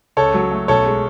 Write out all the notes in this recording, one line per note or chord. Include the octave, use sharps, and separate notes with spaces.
C#2 A4 C#5
F#3
A3
B1 A4 C#5
G#3